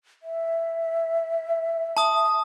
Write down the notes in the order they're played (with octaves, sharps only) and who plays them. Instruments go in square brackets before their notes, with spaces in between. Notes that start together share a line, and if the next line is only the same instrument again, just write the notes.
[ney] E5
[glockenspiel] A5 D#6